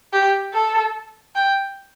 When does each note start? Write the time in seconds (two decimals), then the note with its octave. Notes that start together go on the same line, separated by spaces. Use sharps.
0.13 G4
0.54 A4
1.35 G5